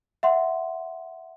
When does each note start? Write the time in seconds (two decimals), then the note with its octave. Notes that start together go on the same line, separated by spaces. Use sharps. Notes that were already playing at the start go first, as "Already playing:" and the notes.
0.23 E5 F#5 C6